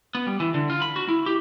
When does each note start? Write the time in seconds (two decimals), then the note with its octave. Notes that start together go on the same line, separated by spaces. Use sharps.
0.15 B3
0.27 G3
0.40 E3
0.54 D3
0.70 F4
0.82 B5
0.96 F#4
1.09 E4
1.26 G4